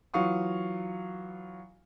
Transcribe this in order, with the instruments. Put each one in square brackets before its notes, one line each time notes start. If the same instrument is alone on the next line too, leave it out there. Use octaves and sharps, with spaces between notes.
[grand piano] E3 F#3 F4 F5 C#6 D#6